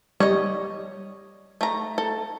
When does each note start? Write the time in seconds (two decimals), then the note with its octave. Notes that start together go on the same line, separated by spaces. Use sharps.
0.20 G3 C#5 D#5
1.61 A3 A#5
1.98 A4